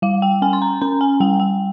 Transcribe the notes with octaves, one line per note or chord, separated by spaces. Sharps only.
G3 F5
G5
C#4 G#5
C6
A#5
C#4 A#5
G#5
G3 G5
G5